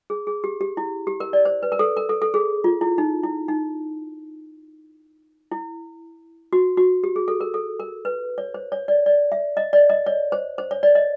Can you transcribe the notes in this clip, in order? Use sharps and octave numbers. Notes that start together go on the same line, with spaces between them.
G#4
G#4
G4
G4
E4
G4
A#4
D5
C5
B4
A#4
A4
A#4
A4
A4
G#4
F4
E4
D#4
E4
D#4
E4
F#4
F#4
G4
G#4
A4
A#4
A4
A#4
B4
C#5
C5
C#5
D5
D5
E5
D#5
D5
D#5
C#5
C5
C5
C#5
D5
D#5